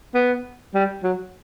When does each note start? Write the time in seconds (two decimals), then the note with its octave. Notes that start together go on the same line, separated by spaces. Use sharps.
0.15 B3
0.75 G3
1.04 F#3